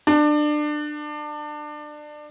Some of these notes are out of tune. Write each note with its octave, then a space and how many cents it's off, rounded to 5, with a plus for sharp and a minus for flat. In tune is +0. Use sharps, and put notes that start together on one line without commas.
D4 +25